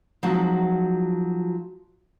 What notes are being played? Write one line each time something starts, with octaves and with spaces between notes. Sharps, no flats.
F3 F#3 G#3 C4 D#4 F#4